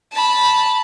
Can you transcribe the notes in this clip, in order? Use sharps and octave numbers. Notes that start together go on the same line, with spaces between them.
A5 B5